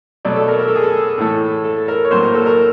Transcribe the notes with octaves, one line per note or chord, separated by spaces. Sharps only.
B2 F#3 A3 D5
A4
A#4
A#4
A4
G#4
A4
A2 E3 A3
A4
A#4
C#5
A2 F#3 A#3 C5
A#4
A4
A#4